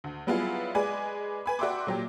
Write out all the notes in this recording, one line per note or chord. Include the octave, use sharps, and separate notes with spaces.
D2
F#3 G3 B3 E4 F4 G#4
G#3 B4 D5 G#5
B4 G#5 B5
F#4 D5 E5 G5 C6 D6
A#2 F#3 G4